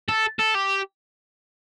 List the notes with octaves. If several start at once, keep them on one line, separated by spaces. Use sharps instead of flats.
A4
A4
G4